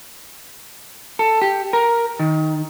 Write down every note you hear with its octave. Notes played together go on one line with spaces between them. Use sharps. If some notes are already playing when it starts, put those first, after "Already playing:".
A4
G4
A#4
D#3